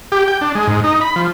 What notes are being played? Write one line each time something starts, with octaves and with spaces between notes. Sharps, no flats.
G4
G5
D4
G#3
G#2
D#4
B5
F3